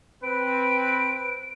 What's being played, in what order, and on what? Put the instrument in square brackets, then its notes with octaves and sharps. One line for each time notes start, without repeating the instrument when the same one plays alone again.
[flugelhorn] C4 [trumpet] B4 [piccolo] D7